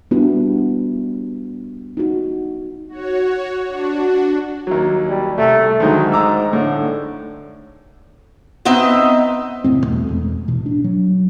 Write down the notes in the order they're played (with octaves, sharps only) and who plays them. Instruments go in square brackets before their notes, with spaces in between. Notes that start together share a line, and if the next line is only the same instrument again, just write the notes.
[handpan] G3 B3 D4 E4 F#4
D#4 F#4
[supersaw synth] F#4 C#5
D4 F#4
[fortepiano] D#2 F#3
[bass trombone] G3
[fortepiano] C2 [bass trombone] A3
[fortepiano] D2 D#3 F#3 [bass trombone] G#2
[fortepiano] A#5 D6 E6
[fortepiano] A2 [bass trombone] D3
[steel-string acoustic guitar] B3 C4 D#4 D#5 E5
[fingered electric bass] D#1 C2 A2 C4
E2 B2 A3
E2 G#2
A1 B2
D4
F#3